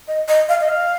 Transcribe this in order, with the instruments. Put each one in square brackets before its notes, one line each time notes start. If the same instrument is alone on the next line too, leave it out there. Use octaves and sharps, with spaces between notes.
[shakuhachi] D#5
D#5
F5
D#5
F5